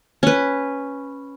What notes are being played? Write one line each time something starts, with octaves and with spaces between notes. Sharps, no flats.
C#4 B4